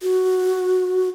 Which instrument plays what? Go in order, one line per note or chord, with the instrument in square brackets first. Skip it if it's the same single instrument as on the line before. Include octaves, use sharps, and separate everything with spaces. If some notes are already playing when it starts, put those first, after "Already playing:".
[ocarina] F#4